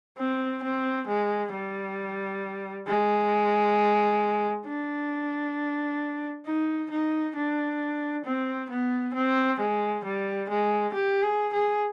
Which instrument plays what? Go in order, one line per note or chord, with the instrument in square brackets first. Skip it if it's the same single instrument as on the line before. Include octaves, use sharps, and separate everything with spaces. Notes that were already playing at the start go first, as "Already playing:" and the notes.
[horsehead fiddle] C4
C4
G#3
G3
G#3
D4
D#4
D#4
D4
C4
B3
C4
G#3
G3
G#3
G4
G#4
G#4